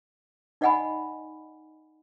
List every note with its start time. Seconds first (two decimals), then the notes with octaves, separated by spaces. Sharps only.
0.61 D#4 D5 D#5 F#5 G#5 B5